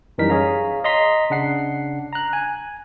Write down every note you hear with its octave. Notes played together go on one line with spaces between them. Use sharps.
F#2 E3 G3 D#4 A#4 B6
G#4 C#5 F5 A#5
D#5 A#5 C6 B6
C#3 D4 F#5 C7
A#5 F#6
G#5